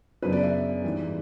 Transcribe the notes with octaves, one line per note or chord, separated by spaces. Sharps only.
F#2 C#3 F#3 B3 D4 B4
D5
E5
G#2 E3 G3